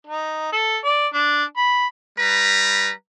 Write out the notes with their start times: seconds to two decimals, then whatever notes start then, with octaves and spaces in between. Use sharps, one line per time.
0.07 D#4
0.53 A4
0.84 D5
1.14 D4
1.57 B5
2.17 G3 B4 A#5